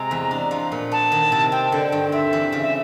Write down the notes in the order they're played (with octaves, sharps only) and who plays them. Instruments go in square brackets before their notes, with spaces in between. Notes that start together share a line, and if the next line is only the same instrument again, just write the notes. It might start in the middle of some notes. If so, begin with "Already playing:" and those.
Already playing: [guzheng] C3 G#3 [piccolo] A#5
[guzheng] E2
D4
F3
A#2
[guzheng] B3 [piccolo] A5
[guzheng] D#3
C3
[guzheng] C4 [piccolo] G5
[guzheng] D3
G2
[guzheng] C4 [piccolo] E5
[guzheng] E3
C#3
[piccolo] E5